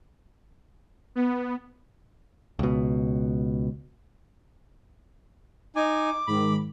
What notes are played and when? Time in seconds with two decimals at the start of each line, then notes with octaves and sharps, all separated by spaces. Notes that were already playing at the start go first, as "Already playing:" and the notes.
1.15 B3
2.59 C#2 B2
5.76 D#4 G#5 D6
6.27 G#2 D#3 B5